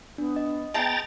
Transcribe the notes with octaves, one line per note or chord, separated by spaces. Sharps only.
B3 D4
D#5
B3 G#4 E5 G5 A5 A#5 A6